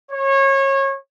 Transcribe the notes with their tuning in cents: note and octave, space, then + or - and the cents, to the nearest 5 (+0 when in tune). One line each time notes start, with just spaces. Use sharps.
C#5 -25